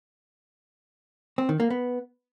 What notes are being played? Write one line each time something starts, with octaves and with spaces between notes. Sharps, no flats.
C4
D#3
A#3
B3